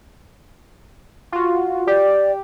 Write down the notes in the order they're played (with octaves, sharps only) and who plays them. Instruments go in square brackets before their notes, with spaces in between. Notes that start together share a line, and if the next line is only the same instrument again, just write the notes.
[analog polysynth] F4 F#4
[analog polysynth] G4 [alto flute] D5